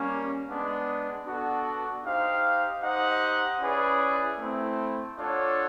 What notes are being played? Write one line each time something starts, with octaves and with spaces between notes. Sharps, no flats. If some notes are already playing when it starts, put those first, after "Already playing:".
Already playing: G3 A#3 C#4
G#3 B3 D4
B3 D4 F#4 A4
D#4 G4 C5 F5
D#4 G4 C5 D#5 F#5
C#4 E4 G#4 B4 D5
A3 C4 E4
D4 F4 A4 C#5 F#5